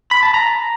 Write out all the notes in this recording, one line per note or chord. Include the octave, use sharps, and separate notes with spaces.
B5
A5
A#5